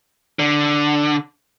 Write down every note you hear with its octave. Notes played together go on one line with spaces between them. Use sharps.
D3